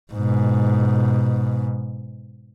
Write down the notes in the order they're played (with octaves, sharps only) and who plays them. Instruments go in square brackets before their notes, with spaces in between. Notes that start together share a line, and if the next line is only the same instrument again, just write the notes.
[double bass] G#2 B2